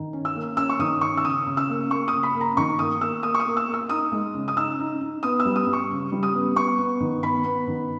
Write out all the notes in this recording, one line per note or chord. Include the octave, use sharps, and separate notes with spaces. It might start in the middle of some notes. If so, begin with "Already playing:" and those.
Already playing: D#3
C#4
E6
A#3
C#4 E6
C#6
D#3 D#6
C#4 C#6
E6
C#3 D#6
C#3
E6
A#3
A#3 C#6
D#6
C#3
B5
A#3
A#5
D#3 C#6
A#3 D#6
A#3 E6
A#3 D#6
C#6
D#6
A#3
E6
A#3
E6
D#4 D#6
G#3
C#3
D#6
D#4 E6
D#4
D#4
B3 D#6
E6
G3
D#6
G3
C#6
C#3
G3
D#6
B3
B3 C#6
B3
D#3
B3 B5
B3
D#3